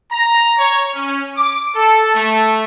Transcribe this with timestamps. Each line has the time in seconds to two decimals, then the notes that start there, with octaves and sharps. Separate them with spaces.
0.10 A#5
0.58 C#5
0.93 C#4
1.37 D6
1.75 A4
2.15 A3